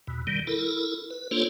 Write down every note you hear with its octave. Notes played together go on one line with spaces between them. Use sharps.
E2 B2
D#3 G3
E4 A4 A#4
B4
A#3 D4 F4 A4 C5 C#5